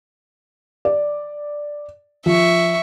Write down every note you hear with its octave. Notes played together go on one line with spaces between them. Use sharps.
D5
F3 E5 C#6